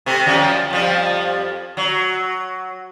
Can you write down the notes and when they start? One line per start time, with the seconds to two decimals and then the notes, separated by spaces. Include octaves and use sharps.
0.06 C3 A3 C4
0.26 F#2 F3 G3
0.71 F2 F3 G3
1.77 F#3